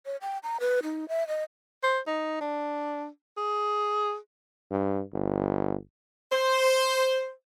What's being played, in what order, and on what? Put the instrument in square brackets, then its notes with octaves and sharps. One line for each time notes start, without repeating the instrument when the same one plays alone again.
[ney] C#5
G5
A#5
B4
D#4
E5
D#5
[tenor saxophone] C5
D#4
D4
G#4
[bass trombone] G2
G1
[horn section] C5